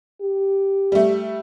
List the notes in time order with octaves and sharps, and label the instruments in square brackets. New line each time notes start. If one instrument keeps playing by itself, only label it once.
[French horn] G4
[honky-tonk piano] G3 A3